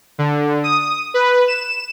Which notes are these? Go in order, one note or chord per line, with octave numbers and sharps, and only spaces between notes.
D3
D#6
B4
E7